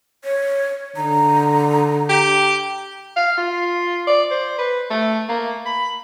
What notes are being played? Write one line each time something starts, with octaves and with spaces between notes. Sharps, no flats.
C#5
D3 A#5
G4
F5
F4
D5
C5
B4
A3
A#3
B5